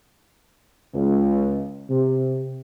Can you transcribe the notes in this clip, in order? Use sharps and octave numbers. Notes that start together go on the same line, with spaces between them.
C#2
C3